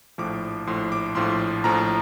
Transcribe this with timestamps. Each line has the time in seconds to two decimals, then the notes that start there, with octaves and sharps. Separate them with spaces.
0.18 A#1 A2 F3 D6
0.67 A#1 A2 F3 C6
0.92 D6
1.15 A#1 A2 F3 C6
1.64 A#1 A2 F3 A#5